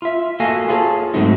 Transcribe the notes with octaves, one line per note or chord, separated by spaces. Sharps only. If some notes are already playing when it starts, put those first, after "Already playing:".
F4 E5
A#3 F#4 A4 D#5 F5 G#5
F4 G#4 A4 C#5
G#2 F#3 G#3 A3 C4 D#4